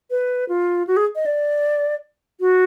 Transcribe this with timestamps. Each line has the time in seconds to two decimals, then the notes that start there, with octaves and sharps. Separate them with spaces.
0.10 B4
0.49 F4
0.87 F#4
0.97 G#4
1.15 D#5
1.26 D5
2.40 F#4